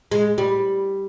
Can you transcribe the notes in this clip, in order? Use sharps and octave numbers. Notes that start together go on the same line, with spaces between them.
G#3
G3